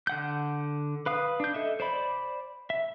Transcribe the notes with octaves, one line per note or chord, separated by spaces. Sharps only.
D3 F#5 G6
B4 F5 D#6
D4 G6
A4 D#5 E5
C5 D5 B5
E5